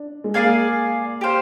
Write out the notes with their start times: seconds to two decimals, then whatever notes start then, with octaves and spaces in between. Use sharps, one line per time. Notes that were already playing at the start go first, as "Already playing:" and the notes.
Already playing: D4
0.24 G#3
0.34 A#3 G#4 D5 F5 G#5
1.21 G4 C5 F5